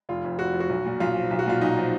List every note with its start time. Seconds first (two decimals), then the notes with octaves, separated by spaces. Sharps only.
0.09 F1 F4
0.25 F2
0.39 F1 F#4
0.54 F3
0.60 F#4
0.69 B1
0.86 A#2
1.00 B1 F4
1.15 F3
1.31 B1
1.39 F#4
1.46 A#2 F4
1.61 B1 D#4
1.77 F3